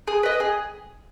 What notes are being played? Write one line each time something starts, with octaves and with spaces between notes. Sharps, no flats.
G#4
B4 D#5
G#4